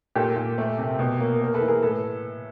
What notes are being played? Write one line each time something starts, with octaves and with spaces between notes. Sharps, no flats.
A#2 G4 A4
A#2
A3
C3
B2
A#3
A#3 A#4
A4 B4
E3
G#4 A#4
A2 A4 B4